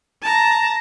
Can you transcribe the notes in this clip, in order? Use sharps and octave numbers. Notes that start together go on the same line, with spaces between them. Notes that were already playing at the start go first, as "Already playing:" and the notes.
A5 A#5